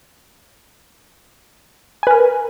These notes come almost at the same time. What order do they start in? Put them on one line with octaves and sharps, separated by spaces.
G#5 B4 A#4